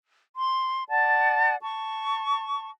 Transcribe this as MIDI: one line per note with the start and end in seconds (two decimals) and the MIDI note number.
0.36 0.84 84
0.90 1.56 74
0.90 1.56 78
0.90 1.56 81
1.61 2.70 81
1.61 2.70 85